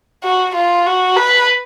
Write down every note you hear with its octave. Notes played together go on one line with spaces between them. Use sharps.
F#4
F4
F#4
B4